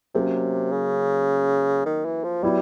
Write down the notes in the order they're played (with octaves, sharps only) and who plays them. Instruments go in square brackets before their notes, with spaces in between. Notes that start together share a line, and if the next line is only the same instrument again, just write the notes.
[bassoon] C3 [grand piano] F#3 A#3 C#4
[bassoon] C#3
D#3
E3
F3
[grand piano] F#3 B3 E4 [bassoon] G3